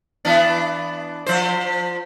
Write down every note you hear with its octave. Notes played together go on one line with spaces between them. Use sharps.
E3 B3 D4
F3 C5